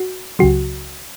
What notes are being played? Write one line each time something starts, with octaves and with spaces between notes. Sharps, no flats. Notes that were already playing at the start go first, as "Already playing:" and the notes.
Already playing: F#4
C#2 C#3 F#3 F#4